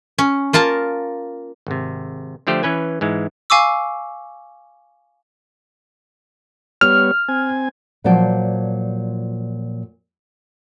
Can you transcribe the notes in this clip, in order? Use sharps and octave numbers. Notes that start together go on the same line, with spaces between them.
C#4
A#3 F4 A#4 A5
G#1 C3
D3 F3 A3 G4 C5
E3 C#4 B4 G#5
G#2 E3 G#3
F5 G#5 C#6 D6 E6
G3 B3 C#5 F6
C4 G#5
A#2 F3 F#3 C5 D5 A5